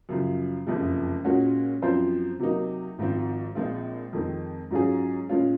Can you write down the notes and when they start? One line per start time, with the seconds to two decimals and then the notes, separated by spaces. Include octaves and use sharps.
0.09 F#2 C#3 F3
0.66 F#1 F2 C3 F3 G#3
1.24 A#2 G#3 C#4 F#4
1.82 F#2 F3 C4 F4 C5
2.39 C3 F#3 A#3 D#4
2.98 G#1 G#2 F3 C4
3.55 A#1 A#2 G#3 C4 F4
4.13 F2 D#3 G#3 C4
4.71 G#2 F#3 C#4 F4 G#4
5.29 A#2 G#3 C#4 F4